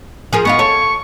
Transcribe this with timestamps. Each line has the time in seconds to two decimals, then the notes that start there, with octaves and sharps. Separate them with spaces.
0.33 F3 G#4 A#4
0.45 B3 D#4 F4 C#6
0.59 A4 C#5